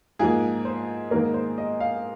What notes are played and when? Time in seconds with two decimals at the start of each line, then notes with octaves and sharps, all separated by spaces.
0.19 G#2 F3 A#3 G#4
0.65 C5
1.11 G#2 D#3 A#3 A#4
1.34 C5
1.58 D#5
1.80 F5